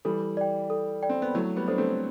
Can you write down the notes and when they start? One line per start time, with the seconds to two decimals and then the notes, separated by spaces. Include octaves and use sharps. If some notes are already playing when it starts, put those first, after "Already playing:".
0.05 E3 G3 A4
0.37 D5 G5
0.70 A4
1.03 D5 G5
1.09 C4
1.22 B3
1.35 F#3 A3 E4
1.56 G3 B3
1.68 D4 A4 C5
1.78 A3 C4